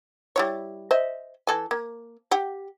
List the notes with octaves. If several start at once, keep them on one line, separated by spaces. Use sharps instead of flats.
G3 E4 C#5
C5 D#5 E5
E3 A4 G#5
A#3
G4 F#5